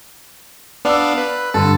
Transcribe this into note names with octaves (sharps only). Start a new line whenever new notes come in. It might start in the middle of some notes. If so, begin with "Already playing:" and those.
B3 D4 D5 F5 E6
B4
G2 D3 A4